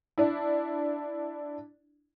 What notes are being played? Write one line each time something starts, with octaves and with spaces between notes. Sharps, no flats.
D4 E4